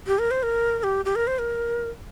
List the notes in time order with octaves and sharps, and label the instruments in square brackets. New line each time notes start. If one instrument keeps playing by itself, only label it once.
[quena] G4
A#4
C5
A#4
A#4
G4
G4
A#4
C5
A#4